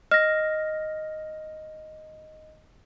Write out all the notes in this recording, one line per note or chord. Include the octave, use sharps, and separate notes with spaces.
D#5 F6 A#6